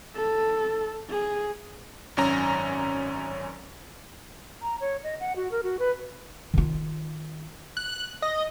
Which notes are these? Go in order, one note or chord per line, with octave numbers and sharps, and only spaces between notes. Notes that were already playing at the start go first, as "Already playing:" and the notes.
A4
G#4
G#1 F#2 C#4 A#5
A#5
C#5
D#5
F#5
F#4
A#4
F#4
B4
D#3 F4
F#6
D#5